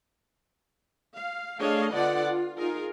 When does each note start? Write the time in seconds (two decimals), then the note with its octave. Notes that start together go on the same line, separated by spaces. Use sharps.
1.14 F5
1.59 A3 D4 G#4 C#5 D#5 F5
1.93 D3 B3 F4 D5 F#5
2.25 F4
2.57 D#4 F4 G#4 A#4